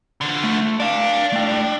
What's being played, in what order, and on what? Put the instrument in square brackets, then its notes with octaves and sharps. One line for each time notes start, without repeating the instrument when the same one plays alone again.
[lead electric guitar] D3 F3
[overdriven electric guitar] A3
[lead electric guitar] D4 [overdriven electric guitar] D5 F5
[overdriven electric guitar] A3 G5